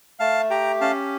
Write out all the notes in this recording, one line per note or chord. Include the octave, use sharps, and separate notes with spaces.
A3 F5 A5
G4 G5 A#5
C#4 F5 A5